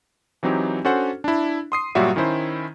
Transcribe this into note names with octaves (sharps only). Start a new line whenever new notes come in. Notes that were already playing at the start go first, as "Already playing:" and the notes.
E3 F#3 C4 D#4 G4
C#4 D4 F#4 A4 C5 F#5
D4 E4
C6 D#6 C7
G1 A#2 F#3 G3 F#4 E5
D#3 C#4 E4 C5